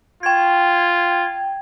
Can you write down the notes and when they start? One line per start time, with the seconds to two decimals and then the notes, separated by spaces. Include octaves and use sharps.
0.23 F4 G5 G#6